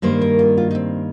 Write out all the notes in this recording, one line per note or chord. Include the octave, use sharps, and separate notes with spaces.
G2 D#3 G3 A#3 C5
A#4
F4
F4
D#4
C4